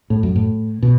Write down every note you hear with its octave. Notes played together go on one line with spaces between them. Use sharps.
A2
F#2
A2
B2